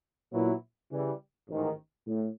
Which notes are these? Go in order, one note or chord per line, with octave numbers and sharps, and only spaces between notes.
A#2 F#3 B3 E4
C#3 E3 G3
A1 G#2 D#3
A2